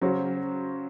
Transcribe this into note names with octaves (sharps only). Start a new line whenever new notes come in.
C#3 F#3 C#4 F#4 C5